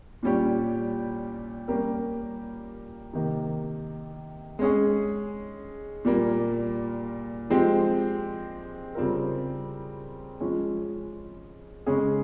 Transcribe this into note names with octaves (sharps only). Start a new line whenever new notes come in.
A#2 G3 C#4 G4
G3 A#3 C#4 G4 A#4
C3 D#3 A#3
G#3 C#4 G#4
A#2 G3 A#3
F3 G#3 C4 G4
C#3 G3 C4 F4 A#4
F3 G#3 C#4
C#3 G#3 C#4 G#4